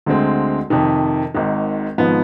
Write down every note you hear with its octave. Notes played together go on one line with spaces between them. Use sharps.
D2 D3 G#3 C4
F2 C3 D#3
G#1 G#2 D#3
G#1 G#2 F3 B3 D#4